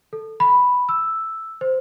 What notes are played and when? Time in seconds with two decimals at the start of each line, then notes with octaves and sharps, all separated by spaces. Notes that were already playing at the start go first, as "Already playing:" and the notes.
0.13 A4
0.40 B5
0.89 E6
1.61 C5